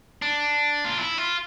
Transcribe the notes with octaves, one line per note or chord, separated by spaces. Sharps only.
D4
F4
E4
F4